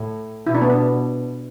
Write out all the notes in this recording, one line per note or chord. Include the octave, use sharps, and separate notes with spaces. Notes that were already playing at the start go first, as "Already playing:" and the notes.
Already playing: A2
B2 E4
D4
B3
D4